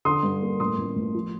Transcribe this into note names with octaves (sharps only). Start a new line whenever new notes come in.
D3 C6 D#6
G2
A#3
A2 C6 D#6
A1
A1
F3